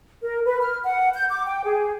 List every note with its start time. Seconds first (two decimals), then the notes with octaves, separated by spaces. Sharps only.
0.22 A#4
0.45 B4
0.61 F6
0.84 F#5
1.14 G6
1.31 D6
1.47 G5
1.64 G#4